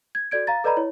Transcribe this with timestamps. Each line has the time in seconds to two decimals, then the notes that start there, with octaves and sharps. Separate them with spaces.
0.15 G#6
0.31 F#4 A4 D5 G#6 D7
0.47 F5 A#5 A6
0.64 A4 B4 D5 D#5 A#5 B5
0.77 E4 C#5